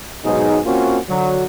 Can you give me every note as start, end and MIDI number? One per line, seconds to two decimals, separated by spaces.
0.24 0.59 44
0.24 0.59 47
0.24 0.59 54
0.24 0.59 63
0.24 0.59 68
0.65 0.98 58
0.65 0.98 60
0.65 0.98 61
0.65 0.98 65
0.65 0.98 66
1.09 1.43 50
1.09 1.43 54